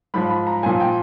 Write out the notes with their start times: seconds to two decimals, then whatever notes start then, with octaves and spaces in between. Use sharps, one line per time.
0.14 G#2 F3 B5
0.30 B5
0.47 A#5
0.63 A#2 F3 G#5
0.80 G5